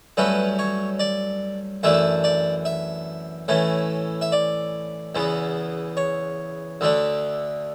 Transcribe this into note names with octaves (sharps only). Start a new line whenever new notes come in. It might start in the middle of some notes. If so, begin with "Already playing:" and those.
G2 F#3 A3 C#4 B4
C#5
D5
F#2 E3 A3 D4 E5
D5
E5
A2 E3 A3 C#4
E5
D5
E2 C#3 E3 B3
C#5
D2 D3 A3 D4